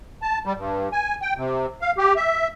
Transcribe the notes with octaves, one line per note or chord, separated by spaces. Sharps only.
A5
G3
G2
G#5
G5
C3
F5
G4
E5